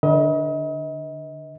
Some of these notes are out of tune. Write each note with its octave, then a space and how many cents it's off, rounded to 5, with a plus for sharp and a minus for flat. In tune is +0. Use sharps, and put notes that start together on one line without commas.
D3 +0 B4 -35 D#5 +35